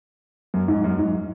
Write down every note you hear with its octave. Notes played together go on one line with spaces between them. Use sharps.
F#2
G#2
F#2
G#2